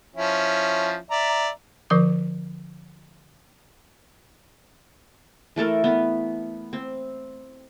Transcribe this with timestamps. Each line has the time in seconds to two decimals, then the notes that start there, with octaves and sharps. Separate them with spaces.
0.16 F3 C#4 E4
1.10 D5 E5 A#5
1.90 D3 F3 A#4 D6
5.56 E3 A3 A4 A#4
5.84 B3
6.73 C4